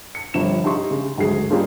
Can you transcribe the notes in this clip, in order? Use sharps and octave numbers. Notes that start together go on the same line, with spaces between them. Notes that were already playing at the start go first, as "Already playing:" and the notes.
C#7
G1 C3 F3 E7
D#4 G4 E5 C6 C#6
C#3
G#1 D2 F#3 G#4 C7
G3 A#3 C#4 D#4 F4 G#4